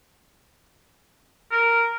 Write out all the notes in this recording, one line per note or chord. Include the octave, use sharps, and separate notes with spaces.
A#4